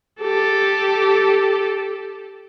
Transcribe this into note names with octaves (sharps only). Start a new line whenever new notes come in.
G4 A4